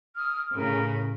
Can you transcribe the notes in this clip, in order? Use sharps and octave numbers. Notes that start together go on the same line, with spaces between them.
D#6 F6
A2 C#3 A#4 B5